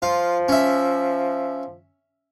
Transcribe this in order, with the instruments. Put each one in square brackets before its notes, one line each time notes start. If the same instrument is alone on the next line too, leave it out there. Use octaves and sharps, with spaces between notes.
[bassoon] F3 [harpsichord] F4
[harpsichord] C#4 E5